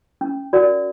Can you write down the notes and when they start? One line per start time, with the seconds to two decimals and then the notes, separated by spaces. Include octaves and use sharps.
0.21 C#4
0.53 F#4 A#4 D5 F#5